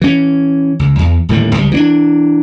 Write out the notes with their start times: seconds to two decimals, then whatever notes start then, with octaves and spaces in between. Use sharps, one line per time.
0.02 E3 C#4
0.79 C#2
0.99 E2
1.29 D#1 A2 D3 D#3
1.55 C#2 G3
1.72 E3 C4 D4